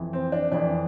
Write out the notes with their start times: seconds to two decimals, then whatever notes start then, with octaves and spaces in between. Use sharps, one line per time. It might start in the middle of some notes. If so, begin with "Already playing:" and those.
Already playing: F2 E3
0.13 C4
0.32 D4
0.52 F2 E3 D4